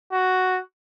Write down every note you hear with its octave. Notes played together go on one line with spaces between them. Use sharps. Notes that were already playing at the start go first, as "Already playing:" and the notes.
F#4